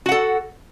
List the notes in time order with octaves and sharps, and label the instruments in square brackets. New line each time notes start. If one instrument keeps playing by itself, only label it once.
[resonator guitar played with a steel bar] F#4
F#5
A4